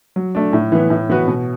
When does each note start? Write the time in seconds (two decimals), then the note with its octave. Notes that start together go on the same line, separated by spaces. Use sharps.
0.16 F#3
0.35 A3 D4
0.53 A2
0.72 E3 B3
0.90 A2
1.09 E3 B3 F#4 B4
1.28 B2